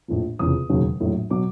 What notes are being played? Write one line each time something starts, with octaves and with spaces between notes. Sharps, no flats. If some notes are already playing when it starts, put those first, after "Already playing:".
A#1 A2 F3
F1 E2 C#3 F3 D#6
E1 D#2 C#3 F#3
A#1 A2 F#3
B2 F#3 D6